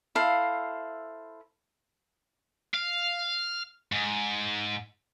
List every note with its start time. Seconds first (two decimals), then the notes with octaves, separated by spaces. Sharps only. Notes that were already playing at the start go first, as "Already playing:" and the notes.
0.15 E4 A4 C5 F5
2.74 F5
3.92 G#2